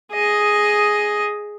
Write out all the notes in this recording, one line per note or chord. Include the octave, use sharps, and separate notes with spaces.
G#4 D#5